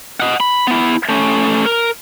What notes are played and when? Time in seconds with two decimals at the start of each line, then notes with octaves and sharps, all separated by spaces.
0.20 D#5 F#5
0.40 B5
0.67 B3 E4
1.09 A3 C#4
1.66 A#4